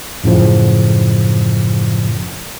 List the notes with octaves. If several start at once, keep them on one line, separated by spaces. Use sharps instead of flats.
F#2 A2 C#3 F3